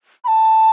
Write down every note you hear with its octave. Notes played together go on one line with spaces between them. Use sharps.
B5
A5